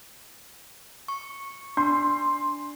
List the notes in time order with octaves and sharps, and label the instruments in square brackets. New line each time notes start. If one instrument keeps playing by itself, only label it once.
[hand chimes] C#6
[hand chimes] D4 [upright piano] C6